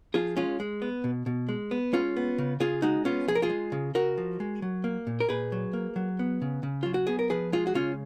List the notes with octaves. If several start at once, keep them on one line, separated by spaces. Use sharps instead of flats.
F3 F4 G#4
G#3 C#4 F4
G#3
B3
B2
B2
G#3
B3
G#3 C#4 F4
B3
C#3
C#3 F4 G#4
G#3 D#4 F#4
B3 C#4 F4
F3 G#4
A#4
F4 G#4
G#3
C#3
C#3 F#4 A#4
F3
G#3
F#3
A#3
A#2
A#4
A#2 G#4 B4
F#3
A#3
F#3
B3
C#3
C#3
F#3 F4
F#4
B3 G#4
A#4
F3 G#4 B4
G#3 F4 G#4
F#4
C#3 C#4 F4